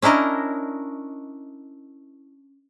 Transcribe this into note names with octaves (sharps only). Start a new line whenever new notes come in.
C#4 D4 E4 A#4 D#5